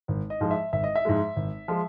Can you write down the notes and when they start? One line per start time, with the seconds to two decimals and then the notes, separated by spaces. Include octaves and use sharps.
0.08 G#1
0.30 D#5
0.40 G#2 F3 G#3
0.51 E5
0.72 G#1 E5
0.84 D#5
0.96 E5
1.05 G#2 F3 G#3
1.36 G#1
1.68 F3 G#3